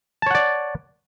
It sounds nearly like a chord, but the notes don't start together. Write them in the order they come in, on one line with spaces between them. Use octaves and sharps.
A5 C#5 F#5 D5